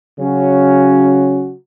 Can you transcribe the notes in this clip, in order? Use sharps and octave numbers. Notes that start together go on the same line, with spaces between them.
C#3 F#3 C#4 F#4